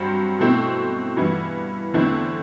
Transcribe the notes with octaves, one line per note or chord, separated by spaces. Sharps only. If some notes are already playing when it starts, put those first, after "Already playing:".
Already playing: G2 F#3 C4
B2 A3 C4 E4
G2 E3 B3 E4
E2 D3 A3 C4 E4